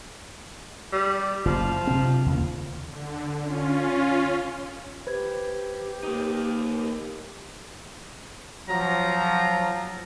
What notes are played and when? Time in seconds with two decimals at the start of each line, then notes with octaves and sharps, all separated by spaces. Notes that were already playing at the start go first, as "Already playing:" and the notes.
0.92 G3
1.45 F#1 F3
1.87 C3 C4
2.26 D#2 C#3 A#3
2.87 D3
3.40 C#4 F4
5.07 G4 B4 C5 G#6
6.03 A#3 D#4
8.69 F3 F#3 A#5